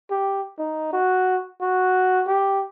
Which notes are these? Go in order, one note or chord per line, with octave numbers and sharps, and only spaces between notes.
G4
D#4
F#4
F#4
G4